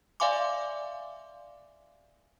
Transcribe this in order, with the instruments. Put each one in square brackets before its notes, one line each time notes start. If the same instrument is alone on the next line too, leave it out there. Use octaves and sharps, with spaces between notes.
[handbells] D5 E5 F5 G#5 C6 D6